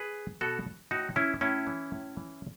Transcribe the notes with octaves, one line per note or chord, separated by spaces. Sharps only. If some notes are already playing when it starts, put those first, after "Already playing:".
Already playing: G#4 B4
B2 F#4 A4
A2 D#4 F#4
E3 C#4 E4
A2 C#4 E4
E3
A2
E3